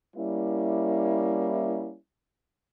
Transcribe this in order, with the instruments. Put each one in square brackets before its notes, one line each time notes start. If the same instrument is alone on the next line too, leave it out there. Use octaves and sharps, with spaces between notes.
[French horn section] G3 A#3 C#4 E4